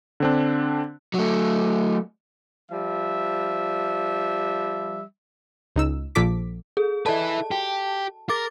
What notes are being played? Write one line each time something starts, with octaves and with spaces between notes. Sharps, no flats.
D3 C4 D4
F#3 A3
F3 G3 E5
C#2 D#4 E6
A#1 A#2 F3 A4 D6 B6
G#4 A4
E4 A4 B4 D5 D#5 A5
F#4 G4 G5
G#4 A#4 D6 A6